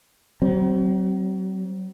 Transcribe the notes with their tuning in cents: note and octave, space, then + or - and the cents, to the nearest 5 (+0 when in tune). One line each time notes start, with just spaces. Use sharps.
F#3 +40 C4 +0